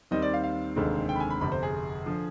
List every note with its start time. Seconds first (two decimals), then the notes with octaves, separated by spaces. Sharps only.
0.11 D#2 D#3 G3 C4 D#5
0.22 D5
0.34 F5
0.44 F5
0.76 F1 D#2 D3 G#3 C4
1.09 G5
1.15 B5
1.20 G#5
1.30 B5
1.41 G1 F2 C3 B5
1.52 C5
1.63 G#4
2.06 D3 F3